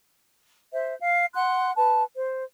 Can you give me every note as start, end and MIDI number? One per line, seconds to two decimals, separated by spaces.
0.74 0.94 72
0.74 0.94 76
1.00 1.25 77
1.34 1.71 78
1.34 1.71 84
1.34 1.71 90
1.77 2.03 71
1.77 2.03 81
2.16 2.42 72